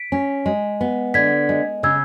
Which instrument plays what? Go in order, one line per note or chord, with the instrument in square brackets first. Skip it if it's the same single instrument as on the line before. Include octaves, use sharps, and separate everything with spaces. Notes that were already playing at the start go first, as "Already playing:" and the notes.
Already playing: [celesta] B6 D7
[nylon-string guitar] C#4
G#3
B3
[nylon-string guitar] D3 [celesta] G#6 B6
[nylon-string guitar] G#3
[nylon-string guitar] C#3 [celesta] E6 G#6